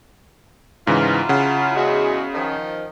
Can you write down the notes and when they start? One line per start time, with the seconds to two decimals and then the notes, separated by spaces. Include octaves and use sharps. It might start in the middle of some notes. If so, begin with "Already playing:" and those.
0.87 G#2 C#3 E3 F#3 E4 F4
1.29 C#3 F#5
1.75 E2 G#3 F#4
2.34 D#3 F3